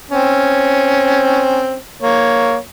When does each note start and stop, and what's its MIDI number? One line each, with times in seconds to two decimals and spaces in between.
0.11 1.77 60
0.11 1.77 61
2.02 2.56 58
2.02 2.56 73